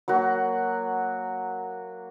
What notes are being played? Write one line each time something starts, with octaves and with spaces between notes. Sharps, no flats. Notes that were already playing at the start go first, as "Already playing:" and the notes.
F#3 A#3 F#4